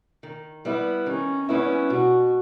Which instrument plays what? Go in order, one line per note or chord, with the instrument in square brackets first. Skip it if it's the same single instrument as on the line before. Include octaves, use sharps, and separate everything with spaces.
[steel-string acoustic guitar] D#3
G3 B3 E4
[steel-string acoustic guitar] D#3 [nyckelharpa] C#4
[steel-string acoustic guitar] G3 B3 E4 [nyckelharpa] C#4
[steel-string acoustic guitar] B2 [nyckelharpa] F#4